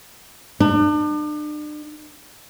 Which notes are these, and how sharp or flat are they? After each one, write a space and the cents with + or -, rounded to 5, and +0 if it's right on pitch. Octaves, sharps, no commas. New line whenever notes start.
D4 +40